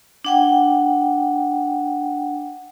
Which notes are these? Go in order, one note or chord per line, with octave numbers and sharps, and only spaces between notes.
D4 F#5 G5